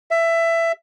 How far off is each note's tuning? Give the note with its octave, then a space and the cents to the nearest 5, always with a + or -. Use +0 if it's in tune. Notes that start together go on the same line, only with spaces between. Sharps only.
E5 +15